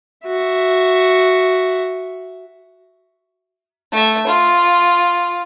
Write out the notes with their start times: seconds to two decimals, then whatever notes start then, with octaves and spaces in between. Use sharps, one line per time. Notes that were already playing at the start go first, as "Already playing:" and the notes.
0.26 F#4 E5
3.92 A3 E5
4.27 F4